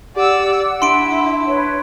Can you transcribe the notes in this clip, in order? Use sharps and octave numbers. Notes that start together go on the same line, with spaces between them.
G4 D5 F#5 E6
D4 E4 C6 D7
B4 C#5